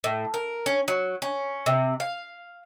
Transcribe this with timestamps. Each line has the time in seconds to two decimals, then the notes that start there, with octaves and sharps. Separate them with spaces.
0.04 A2
0.34 A#4
0.66 C#4
0.88 F#3
1.22 C#4
1.66 C3
2.00 F5